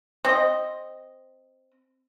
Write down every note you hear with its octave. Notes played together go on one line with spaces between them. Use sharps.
C4 D#5